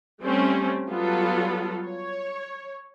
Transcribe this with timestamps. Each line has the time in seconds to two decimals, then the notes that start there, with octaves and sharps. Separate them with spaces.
0.22 G3 A3 C4 C#4
0.89 F#3 G3 B3 F4 A4
1.86 C#5